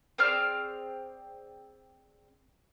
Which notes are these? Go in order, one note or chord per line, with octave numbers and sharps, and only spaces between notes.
C4 G#4 D5 F6